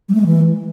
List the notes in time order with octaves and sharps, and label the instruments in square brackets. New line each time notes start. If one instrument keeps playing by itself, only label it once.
[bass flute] G3
A3
G#3
E3